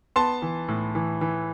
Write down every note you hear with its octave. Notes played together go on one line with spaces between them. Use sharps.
B3 A5 C6
E3
A2
E3
E3